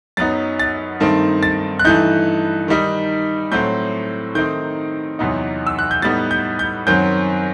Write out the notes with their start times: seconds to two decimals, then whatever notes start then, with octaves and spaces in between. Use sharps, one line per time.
0.17 F#2 F#3 B3 D#4 A6
0.60 A6
1.00 G2 D#3 A3 C4 D#4
1.43 A6
1.79 F#6
1.85 G2 E3 A3 D#4 G6
2.68 D#3 G3 D#4
3.52 A2 F#3 A3 C4 G6
4.35 D#3 A3 C4 D#4 G6
5.19 E2 C3 F#3 B3 D#4
5.67 E6
5.79 F#6
5.91 G6
6.02 A2 G3 B3 D#4 A6
6.31 G6
6.59 G6
6.87 F#2 D#3 F#3 C4 G6